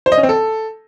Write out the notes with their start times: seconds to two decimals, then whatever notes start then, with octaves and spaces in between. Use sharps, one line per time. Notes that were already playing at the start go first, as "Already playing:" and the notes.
0.06 C5
0.12 D#5
0.18 C#4
0.23 C4
0.29 A4